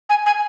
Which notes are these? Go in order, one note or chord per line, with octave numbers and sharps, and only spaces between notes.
G#5
G#5